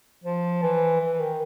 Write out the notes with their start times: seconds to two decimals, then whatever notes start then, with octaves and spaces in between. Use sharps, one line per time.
0.24 F3
0.63 E3
1.01 E3
1.20 D#3